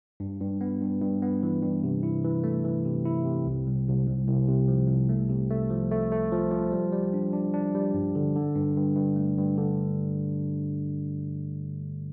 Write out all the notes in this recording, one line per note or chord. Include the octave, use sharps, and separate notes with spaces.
G2
G2
B3
G2
G2
B3
E3
G2
C3
E4
E3
A3
E3
C3
E4
C3
C2
C2
C2
C2
C2
C3
F3
C2
A3
C3
A3
F3
A3
A3
F3
F3
G3
G3
D4
D4
D4
G3
G2
D3
D3
G2
G2
G2
A3
G2
D3